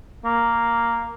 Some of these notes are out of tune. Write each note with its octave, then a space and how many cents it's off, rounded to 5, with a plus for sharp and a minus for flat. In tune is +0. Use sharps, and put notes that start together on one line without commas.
A#3 +0